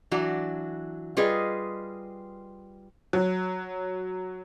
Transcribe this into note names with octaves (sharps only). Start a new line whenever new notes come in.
E3 F#3 D4 F#4 A#5
G3 F4 G#4 B4 D#5
F#3